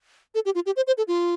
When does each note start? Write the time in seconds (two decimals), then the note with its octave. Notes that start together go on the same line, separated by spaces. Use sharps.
0.35 A4
0.45 G4
0.55 F4
0.66 G4
0.76 C5
0.87 C5
0.98 A4
1.08 F4